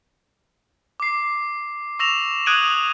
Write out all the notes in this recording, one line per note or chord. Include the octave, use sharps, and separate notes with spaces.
D6 C7
C#6 E6 A#6 E7 F7
D#6 F#6 G#6 D7 D#7 F#7